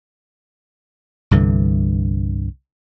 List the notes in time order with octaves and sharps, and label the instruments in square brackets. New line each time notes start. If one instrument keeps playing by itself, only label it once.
[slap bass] C2 G2 D3 E3